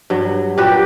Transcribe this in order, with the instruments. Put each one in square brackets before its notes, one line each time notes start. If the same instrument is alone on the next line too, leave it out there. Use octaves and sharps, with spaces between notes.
[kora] G2 F#3
[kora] A#2 F#4 B4 [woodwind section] G4